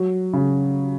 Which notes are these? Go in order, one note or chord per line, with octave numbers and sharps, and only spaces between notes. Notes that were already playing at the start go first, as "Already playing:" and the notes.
Already playing: F#3
C#3